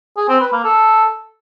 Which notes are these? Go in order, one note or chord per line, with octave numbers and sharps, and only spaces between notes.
G#4
C4
B4
A#3
A4